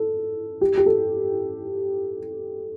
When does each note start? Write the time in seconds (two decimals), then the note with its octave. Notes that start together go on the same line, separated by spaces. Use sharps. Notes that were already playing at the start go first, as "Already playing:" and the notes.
Already playing: A4
0.61 G4
0.78 G4
0.86 A4